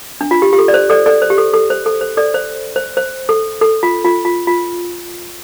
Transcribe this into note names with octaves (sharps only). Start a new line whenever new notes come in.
D4
F4
G4
G4
A4
D5
C5
A4 D5
A4 D5
C5
G4
A4
A4
C5
A4
C5
A4 D5
C5
C5
C5
A4
A4
F4
F4
F4
F4